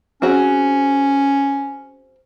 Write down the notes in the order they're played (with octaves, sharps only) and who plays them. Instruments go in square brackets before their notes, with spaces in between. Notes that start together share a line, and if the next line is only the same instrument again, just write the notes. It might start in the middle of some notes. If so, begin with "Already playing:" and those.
[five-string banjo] C4 F#4 G#4 [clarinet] C#4